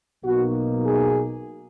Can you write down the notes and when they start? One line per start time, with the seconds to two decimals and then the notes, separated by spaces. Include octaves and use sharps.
0.24 B1 B2 A#3 D#4 F#4
0.85 G#4